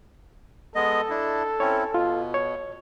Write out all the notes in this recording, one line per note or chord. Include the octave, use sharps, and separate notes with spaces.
G#3 B3 A4 D#5
D4 E4
C4 C#4 E4 C#5
B2 F4
C#5